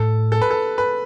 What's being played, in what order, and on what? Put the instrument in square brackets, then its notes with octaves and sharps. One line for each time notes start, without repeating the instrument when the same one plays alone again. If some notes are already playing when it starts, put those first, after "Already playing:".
Already playing: [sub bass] A2 [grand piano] A4
[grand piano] A4
B4
A4
B4